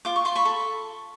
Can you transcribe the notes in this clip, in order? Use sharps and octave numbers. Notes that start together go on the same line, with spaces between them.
F4 D6
C#6
F4 C6
B5 C#6
A4